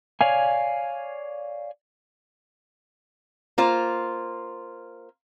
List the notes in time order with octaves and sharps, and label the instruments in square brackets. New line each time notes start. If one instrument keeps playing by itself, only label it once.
[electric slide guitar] C#5 D5 F5 G#5
[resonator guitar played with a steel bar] A#3 F4 C5